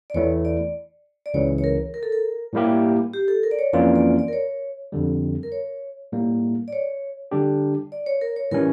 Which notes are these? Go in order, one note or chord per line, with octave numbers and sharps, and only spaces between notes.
D5
E2 E3 A3 E4 C#5
D5
D5
C#2 C#3 E3 C#5
C#5
A#4
A#4
A4
A#4
A2 G3 A#3 E4 G4
G4
A4
A#4
D5
C#5
F2 E3 A#3 C#4 F4 D5
D5
D5
A#4
C#5
F2 D3 G3
A#4
C#5
A2 G3 A#3
D5
C#5
D3 G3 D4 G4
D5
C#5
A#4
C#5
A2 E3 G3 C#4 A#4